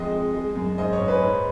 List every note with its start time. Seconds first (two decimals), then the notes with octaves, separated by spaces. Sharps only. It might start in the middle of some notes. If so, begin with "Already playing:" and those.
Already playing: F2 G#3 D#5
0.12 G#3
0.34 G#3
0.56 F#2
0.78 G#2 D#5
0.93 C#5
1.00 G#2
1.08 B4
1.22 G#2